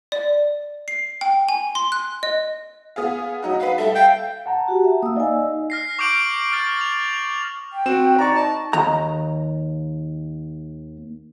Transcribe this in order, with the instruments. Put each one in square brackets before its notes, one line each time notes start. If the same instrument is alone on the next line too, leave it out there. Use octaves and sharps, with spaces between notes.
[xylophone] D5
C7
G5
G#5
C6
F#6
D#5
[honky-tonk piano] B3 G#4 F5
F#3 D#4 F#4
[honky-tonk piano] F#4 B4 [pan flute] F5
[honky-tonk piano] G3 A4 [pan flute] E5
[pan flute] F5 [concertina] G5
[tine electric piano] F#5 A5 A#5
[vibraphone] F#4 G4
E5
[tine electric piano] A#3 [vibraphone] D#6 E6
[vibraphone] D#4 G#5 [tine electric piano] D5 D#5 F5
[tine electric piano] D#5
[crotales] F6 A#6 C7
C#6 D6 F6 G6 D7 F#7
F6 A6 D7
F7
F7
[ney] G5
[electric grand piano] C4 E7 [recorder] F#4
[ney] D#4 [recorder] D5 [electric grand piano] A#5 C#6
[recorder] A5
[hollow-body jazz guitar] D#2 A#5